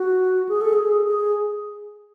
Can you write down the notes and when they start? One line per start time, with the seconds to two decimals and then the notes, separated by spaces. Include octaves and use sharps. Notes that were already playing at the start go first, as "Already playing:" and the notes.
Already playing: F#4
0.49 G#4
0.61 A4
0.73 G#4
1.06 G#4